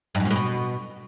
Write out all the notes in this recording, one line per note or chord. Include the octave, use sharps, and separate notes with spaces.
G2
F#2
A#2
A2
B2